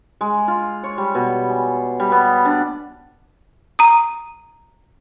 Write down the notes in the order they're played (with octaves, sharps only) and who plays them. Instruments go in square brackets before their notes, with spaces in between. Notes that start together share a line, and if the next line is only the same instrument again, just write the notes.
[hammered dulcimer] G#3
F4
C#5
G3
B2
G#4
G3
B3
D4
[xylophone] A#5 D#6